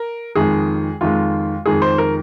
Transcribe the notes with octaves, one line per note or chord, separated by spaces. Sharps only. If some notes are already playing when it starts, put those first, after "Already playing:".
Already playing: A#4
F2 D#3 G#3 G#4
F2 D#3 G#3 F4
F2 D#3 G#3 G#4
C5
A#4